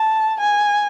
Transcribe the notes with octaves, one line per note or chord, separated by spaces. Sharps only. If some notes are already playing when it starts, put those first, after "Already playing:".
Already playing: A5
G#5